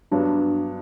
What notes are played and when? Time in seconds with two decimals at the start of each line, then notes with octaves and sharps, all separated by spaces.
0.11 G2 F#3 B3 D4